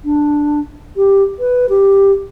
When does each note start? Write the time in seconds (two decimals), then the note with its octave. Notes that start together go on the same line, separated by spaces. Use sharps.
0.05 D4
0.97 G4
1.39 B4
1.69 G4